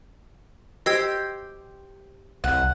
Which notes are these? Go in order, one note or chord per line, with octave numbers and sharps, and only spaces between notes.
G4 C5 D#5 E6 G#6
C2 F#5